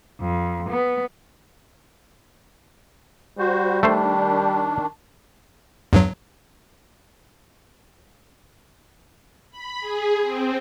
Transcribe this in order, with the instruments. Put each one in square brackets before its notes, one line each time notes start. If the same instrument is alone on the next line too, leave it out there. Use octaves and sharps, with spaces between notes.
[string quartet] F2
B3
[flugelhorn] G3 [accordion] F#4 C5
[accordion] D#3 D4 [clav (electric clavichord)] A3 C5
[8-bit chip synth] E2 G2 F#3
[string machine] B5
G#4
C4